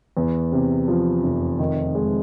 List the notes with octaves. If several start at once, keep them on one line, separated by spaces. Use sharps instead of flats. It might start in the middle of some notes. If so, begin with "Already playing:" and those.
E2
C3
F3
F1
D#3
G#3